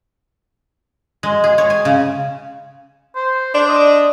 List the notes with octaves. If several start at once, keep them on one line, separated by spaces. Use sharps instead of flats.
G#3
G#4
C#5
G#5
C#3
C5
D4 C5
D#5